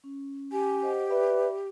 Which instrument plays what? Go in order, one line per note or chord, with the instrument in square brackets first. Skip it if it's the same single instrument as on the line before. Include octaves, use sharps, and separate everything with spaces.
[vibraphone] C#4
[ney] G4 [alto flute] G#5
[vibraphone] C5 D#5 F#5
[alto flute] B4 [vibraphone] D5 E5 B5